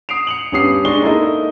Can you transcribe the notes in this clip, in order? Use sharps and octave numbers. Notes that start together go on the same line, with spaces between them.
D#6 C7 D7 F7
C#7 F7 F#7
G2 B3 C#4 G4 D#6 C7
G#3 D4 C#6 G7
A#3 D#4 E4 A4 D#5